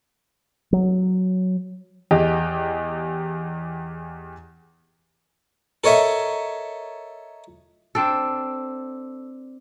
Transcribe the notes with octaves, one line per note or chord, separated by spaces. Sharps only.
F#3
E2 G4 G#4 D#5
A4 A#4 C#5 D#5 E5
C4 D4 A4